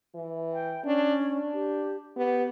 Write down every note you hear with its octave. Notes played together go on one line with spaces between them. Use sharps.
E3
G5
C#4 D4
D4
G4
B3 G4